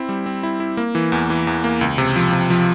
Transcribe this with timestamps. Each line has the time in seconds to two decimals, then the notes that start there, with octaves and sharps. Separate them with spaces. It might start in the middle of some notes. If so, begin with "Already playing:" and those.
Already playing: C4 E4
0.09 G3
0.26 C4
0.43 E4
0.60 E4
0.77 A#3
0.95 E3
1.12 E2
1.30 E3
1.47 E2
1.64 A#3
1.81 C#2
1.98 C3
2.16 F3
2.33 C3
2.50 F3